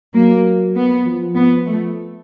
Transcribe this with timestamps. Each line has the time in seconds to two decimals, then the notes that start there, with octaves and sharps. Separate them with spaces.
0.14 F#3 A#3
0.76 B3
1.06 F3
1.35 B3
1.66 A3